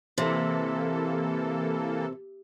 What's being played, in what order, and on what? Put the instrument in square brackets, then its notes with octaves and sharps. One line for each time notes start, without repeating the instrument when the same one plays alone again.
[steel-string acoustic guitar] C3 [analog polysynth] E3 A#3 A4